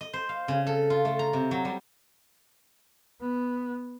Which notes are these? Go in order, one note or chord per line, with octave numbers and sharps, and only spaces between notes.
D#5
C5
F5
C#3
A4
F4
A3
A#5
C3
F#3
G3
B3